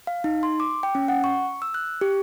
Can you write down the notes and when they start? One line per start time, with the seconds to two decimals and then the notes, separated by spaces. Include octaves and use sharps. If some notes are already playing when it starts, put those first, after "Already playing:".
0.07 F5
0.24 D#4
0.43 C6
0.60 D6
0.83 G5
0.95 C#4
1.08 F#5
1.24 C#6
1.62 E6
1.74 F#6
2.01 G4